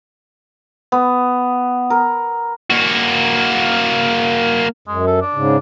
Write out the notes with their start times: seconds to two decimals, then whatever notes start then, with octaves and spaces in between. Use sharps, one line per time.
0.92 B3
1.90 A#4
2.70 A#3 F#4
4.88 F#2 G#3
5.07 A4
5.21 D4
5.34 G#2 C#3